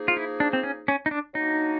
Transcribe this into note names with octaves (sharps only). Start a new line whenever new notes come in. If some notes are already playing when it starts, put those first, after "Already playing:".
Already playing: F3 A#3 D#4 G#4
F4
E4
D4
C4
C#4
C#4
D#4
D4
F#3 A#3 D4 D#4 F#4